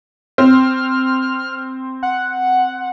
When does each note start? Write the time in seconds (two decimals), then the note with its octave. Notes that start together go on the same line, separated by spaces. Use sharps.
0.38 C4 F6
2.03 F#5